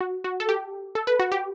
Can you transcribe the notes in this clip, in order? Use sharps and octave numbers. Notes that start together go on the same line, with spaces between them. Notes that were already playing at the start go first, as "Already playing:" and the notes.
F#4
F#4
A4
G4
A4
B4
F#4
G4